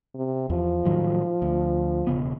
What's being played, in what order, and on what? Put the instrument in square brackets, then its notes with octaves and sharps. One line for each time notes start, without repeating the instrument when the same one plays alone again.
[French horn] C3
[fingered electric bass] E2 [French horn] F3
[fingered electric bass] A2 D#3 F#3
D2
E1 C#3 B3